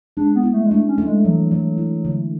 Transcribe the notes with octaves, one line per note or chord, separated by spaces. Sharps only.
G#3 D4
B3
E4
A3
G#3
A3 D4
C#4
A3
G#3
E3 F#3
F#3 A3
E4
D3